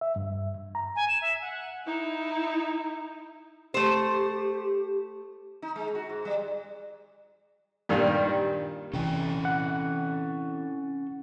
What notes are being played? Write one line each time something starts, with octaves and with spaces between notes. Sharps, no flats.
E5
G2
A#5
G#5
E7
E5
F#5
D#4 E4
A3 G4 C5
D#4
G#3
F#4
G#2
G3
G2 A#2 D#3 G3
C3 E3 C#4 A4 G5
F#5